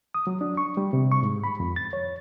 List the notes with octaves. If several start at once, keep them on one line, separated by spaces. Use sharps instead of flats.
D#6
F#3
D4
C#6
G3
C3
C#6
G#2
B5
F2
A6
C#5